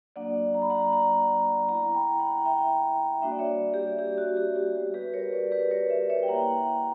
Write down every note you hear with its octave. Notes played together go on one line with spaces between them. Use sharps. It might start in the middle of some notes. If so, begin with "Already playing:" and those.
F#3 A#3 D4 F#4 D5 F#5
A#5
B5
F#5 A#5
F#5 A#5
B3 E4 F#5 A#5
G5 B5
F#5 A#5
E5 G5
G3 A#3 D4 F#4 E5
D5
C#5 E5
G4
G4
F#4
G4
G4
G3 B3 F#4
G4 B4
A#4 C#5
B4 D5
G4 B4
A#4 C#5
C#5 E5
C#5 E5
G5
A#3 E4 F#5 A#5